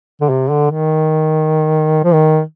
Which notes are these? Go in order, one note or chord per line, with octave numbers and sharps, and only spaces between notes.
D3
C3
D3
D#3
F3
D#3